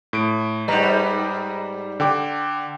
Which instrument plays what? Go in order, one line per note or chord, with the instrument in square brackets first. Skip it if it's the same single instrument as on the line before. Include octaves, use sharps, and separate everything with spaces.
[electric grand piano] A2 D7
[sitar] G#2 G3 [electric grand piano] B4 D#5 A#5
[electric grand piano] D3 G5 D6